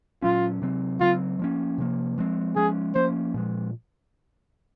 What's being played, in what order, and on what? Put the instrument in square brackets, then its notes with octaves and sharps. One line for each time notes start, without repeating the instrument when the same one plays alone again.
[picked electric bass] A#2 F#3 C#4 [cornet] F4
[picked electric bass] C3 F#3 C4
[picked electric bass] C#3 F#3 C4 [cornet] F4
[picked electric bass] F3 A#3 C#4
C3 F3 A#3
F3 G#3 C4
[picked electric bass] F3 G#3 C#4 [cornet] G#4
[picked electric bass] F3 A#3 C#4 [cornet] C5
[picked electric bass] A#2 F3 G#3